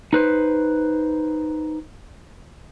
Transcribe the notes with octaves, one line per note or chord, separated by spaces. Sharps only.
D#4 B4 C5